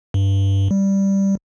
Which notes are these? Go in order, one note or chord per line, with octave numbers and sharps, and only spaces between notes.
G2
G3